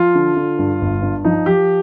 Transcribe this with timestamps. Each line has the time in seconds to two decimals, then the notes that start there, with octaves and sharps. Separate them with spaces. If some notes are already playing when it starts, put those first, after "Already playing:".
Already playing: F3 F4
0.15 D3
0.36 D3
0.59 G2
0.81 G1
1.02 G2
1.25 F3 D#4
1.46 F3 G4